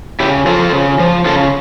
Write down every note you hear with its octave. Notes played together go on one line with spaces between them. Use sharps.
C#3 E4 G4
F3 F4 A4
C#3
F3
C#3 F4 A4